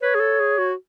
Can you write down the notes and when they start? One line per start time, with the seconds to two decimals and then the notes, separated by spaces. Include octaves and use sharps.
0.01 B4 C#5
0.15 G#4
0.20 A4
0.40 G#4
0.58 F#4